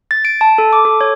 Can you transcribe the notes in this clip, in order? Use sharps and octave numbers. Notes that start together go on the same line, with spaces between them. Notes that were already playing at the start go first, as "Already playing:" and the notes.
A6
D7
A5
A4
D6
A4
C#5